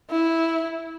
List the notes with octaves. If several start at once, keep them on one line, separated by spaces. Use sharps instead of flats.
E4